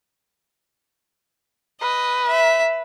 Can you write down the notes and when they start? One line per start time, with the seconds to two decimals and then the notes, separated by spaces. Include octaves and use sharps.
1.81 B4 D#5
2.28 E5